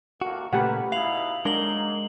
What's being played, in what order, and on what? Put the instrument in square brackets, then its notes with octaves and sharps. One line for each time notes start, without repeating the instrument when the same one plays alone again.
[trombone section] D#2 A3 A#3 [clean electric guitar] F#4
[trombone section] C#2 A#4 B4 [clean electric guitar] A#2 C#3 A3 [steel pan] G4 F#5
[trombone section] B2 D#4 E4 [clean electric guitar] F5 [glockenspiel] C7 F7 F#7
[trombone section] F#3 A#3 D#4 [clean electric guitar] G#3 A#4 [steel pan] D4 [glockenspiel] F#7 G7